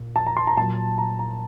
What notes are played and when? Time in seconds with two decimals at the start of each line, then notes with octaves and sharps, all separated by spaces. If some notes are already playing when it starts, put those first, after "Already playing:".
Already playing: A#2
0.16 A5
0.27 A#5
0.37 C6
0.47 A#5
0.57 A#2 F#3 A5
0.98 A#5
1.19 A#5